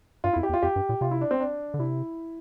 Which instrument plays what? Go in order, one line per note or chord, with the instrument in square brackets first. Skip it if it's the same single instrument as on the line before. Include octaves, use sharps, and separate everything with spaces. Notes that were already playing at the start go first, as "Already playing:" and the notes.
[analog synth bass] G2 [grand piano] F4
[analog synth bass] F2 [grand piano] E4
[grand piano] G4
[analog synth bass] E2
[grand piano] F4
[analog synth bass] F2 [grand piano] G4
[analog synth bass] G2
A#2
[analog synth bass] C3 [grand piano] F4
[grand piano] E4
D4
C4
D4
[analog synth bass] D3
[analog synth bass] C3 [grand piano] E4